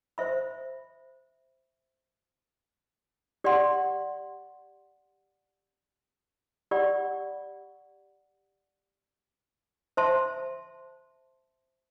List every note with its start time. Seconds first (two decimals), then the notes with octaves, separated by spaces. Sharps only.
0.18 C5 E5 B5
3.44 G4 D5 F#5 C6
6.71 G4 D5 F#5 B5
9.97 C5 E5 A5 C6